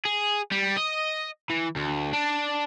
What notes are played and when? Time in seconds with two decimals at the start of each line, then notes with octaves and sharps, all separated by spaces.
0.05 G#4
0.52 G3
0.77 D#5
1.50 E3
1.76 D2
2.13 D4